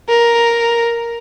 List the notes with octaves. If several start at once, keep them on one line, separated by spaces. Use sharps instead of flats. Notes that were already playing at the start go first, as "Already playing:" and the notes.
A#4